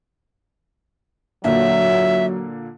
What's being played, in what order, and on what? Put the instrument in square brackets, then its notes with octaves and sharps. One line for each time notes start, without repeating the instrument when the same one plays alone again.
[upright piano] A#2 D3 A#3 [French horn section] F#3 [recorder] E5